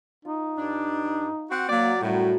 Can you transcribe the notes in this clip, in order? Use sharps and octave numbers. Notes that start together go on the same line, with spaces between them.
D#4 F4
G2 D4
C4 F#4 F#5
F#3 A#3 F#4 D5 A#5
F#2 A2 F#3 G3